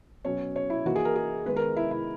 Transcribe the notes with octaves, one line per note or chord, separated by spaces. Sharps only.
B2 F#3 C#4 C#5
C#5
E4
E3 A#3 D#4 F#4
G#4
A#4
G#4
D#3 G#3 B3 B4
A#4
E4
E4